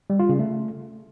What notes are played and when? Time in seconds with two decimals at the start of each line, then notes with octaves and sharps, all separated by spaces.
0.10 G3
0.19 F4
0.29 C#3
0.39 A3